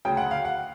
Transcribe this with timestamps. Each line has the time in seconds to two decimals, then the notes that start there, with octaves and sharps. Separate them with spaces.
0.05 D2 C#3 F#3 G5
0.17 F#5
0.31 F5
0.45 F#5